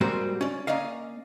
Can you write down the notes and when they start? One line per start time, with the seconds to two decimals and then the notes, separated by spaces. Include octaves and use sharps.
0.01 G#2 G3 A#3 C4 F#4 C5
0.41 C#4 D5
0.67 A#3 C#4 D5 D#5 F5